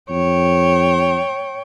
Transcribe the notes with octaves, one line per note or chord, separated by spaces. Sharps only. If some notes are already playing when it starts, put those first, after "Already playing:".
F2 C#5 G5